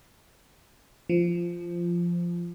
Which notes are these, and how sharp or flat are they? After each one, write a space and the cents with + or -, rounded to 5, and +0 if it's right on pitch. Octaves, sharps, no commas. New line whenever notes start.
F3 -10